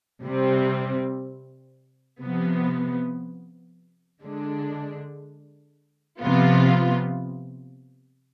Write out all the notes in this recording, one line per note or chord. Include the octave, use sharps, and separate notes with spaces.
C3 G3 C4
C3 F3 B3
D3 G#3 D4
C3 F3 B3 F4